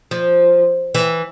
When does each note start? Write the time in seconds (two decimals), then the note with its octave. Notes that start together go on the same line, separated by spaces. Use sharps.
0.11 F3
0.94 E3